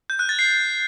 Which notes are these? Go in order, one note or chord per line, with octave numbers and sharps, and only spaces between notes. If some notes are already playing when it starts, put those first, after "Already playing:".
G6
F#6
A6
C7